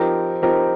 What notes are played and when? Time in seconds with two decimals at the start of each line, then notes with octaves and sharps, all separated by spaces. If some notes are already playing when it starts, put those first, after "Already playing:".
Already playing: F3 C4 D#4 G4 A#4
0.42 F3 C4 D#4 G4 A#4